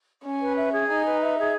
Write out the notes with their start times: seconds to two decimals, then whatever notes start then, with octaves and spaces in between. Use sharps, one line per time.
0.24 C#4 G#5
0.41 B4
0.56 E5
0.72 G#4
0.88 D#4 G#5
1.05 B4
1.20 E5
1.36 G#4